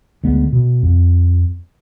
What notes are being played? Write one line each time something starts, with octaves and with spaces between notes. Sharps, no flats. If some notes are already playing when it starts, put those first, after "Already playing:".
D2 G#3 B3
B2
F2